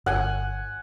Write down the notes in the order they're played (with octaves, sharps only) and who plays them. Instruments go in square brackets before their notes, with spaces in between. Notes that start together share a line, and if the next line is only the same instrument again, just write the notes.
[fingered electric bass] G1 [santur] F#5 G#5